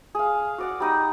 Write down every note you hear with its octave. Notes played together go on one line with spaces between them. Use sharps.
G#4 F5
F#4 D5 F#5
G3 D#4 D#5